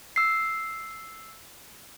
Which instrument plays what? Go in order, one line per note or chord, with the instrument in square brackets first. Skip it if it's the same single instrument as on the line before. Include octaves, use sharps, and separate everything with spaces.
[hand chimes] E6 C7